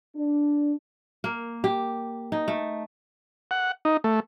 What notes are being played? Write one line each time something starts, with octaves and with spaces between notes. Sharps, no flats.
D4
A#3
G4
D#4
A3
F#5
D#4
A3